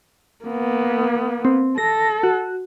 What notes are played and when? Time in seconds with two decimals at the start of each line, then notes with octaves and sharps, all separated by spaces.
0.46 A#3 B3
1.45 C4
1.78 A4 A#6
2.23 F#4